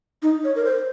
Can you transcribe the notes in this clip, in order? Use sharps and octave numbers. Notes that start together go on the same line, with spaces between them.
D#4
C#5
A#4
C5